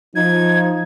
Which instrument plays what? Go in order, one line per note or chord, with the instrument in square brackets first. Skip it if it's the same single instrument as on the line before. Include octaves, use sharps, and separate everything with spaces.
[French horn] F3 [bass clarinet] D#4 [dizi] G#6